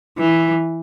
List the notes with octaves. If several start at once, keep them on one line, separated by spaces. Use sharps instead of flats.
E3